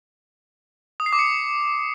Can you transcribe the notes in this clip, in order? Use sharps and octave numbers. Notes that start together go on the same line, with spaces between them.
D#6
C7
D6
C#7